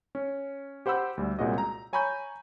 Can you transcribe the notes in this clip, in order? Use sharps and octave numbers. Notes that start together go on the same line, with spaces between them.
C#4
G4 C5 F#5 B5 E6 G6
D2 G3
C2 A#2 G#3 C#4 F#4 D#5
A#5
C#5 G#5 A#5 B5 C#6 G6